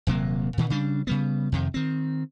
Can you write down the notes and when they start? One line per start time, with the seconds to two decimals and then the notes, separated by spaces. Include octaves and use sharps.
0.07 D#1 C3 F#3 A#3
0.58 A#2 D#3 E3
0.70 C#3 G3 D4
1.07 C#3 G3 B3
1.52 F2 C3 D#3
1.74 D#3 C4